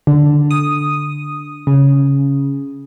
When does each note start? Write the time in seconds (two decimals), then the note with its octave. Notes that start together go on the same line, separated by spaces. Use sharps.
0.07 D3
0.51 D#6
1.67 C#3